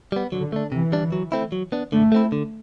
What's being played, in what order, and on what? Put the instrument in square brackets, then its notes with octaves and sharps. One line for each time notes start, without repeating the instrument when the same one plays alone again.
[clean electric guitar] G3 B3
[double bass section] D3 [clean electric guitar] F#3
[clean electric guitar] A3 D4
[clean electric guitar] C3 [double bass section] E3
[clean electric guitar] G3 D4
F#3
A3 C4 E4
F#3
B3 D4
[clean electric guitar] D3 [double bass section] A3
[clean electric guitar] A3 C4 E4
D3